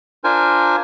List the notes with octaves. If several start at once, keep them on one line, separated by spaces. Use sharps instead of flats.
D4 F4 A#4 C5 G#5